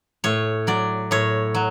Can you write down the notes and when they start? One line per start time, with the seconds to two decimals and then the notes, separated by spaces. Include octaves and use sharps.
0.24 A2 C#5
0.67 F#3 D5
1.11 A2 C#5
1.55 F#3